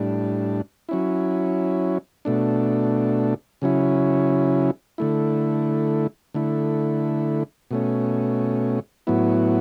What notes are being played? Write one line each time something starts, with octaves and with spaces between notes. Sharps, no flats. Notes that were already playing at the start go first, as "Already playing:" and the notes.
Already playing: A2 G3 D4
F#3 C#4 E4
B2 A3 D4
C#3 F#3 C#4 E4
D3 A3 E4
D3 A3 E4
B2 A3 C#4
A2 F#3 B3 E4